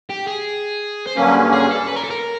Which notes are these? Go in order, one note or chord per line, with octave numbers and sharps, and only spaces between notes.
G4
G#4
C5
G2 D3 F#3 A#3 C#4 B4
G#4
A4
B4
A#4
A4
A#4